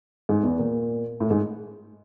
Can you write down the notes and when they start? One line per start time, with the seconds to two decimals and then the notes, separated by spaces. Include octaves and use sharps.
0.29 G#2
0.43 E2
0.59 A#2
1.20 A2
1.31 G#2